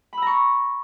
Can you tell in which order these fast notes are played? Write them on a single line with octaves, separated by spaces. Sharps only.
B5 E6 A#5 C#6